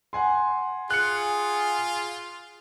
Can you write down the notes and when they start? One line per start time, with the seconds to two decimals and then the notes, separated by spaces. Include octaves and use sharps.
0.13 F#5 G#5 C6
0.91 F4 G#4 F#6 C#7